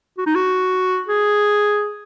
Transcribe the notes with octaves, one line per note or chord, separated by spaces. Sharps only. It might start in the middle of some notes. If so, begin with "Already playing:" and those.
F#4
D#4
F#4
G#4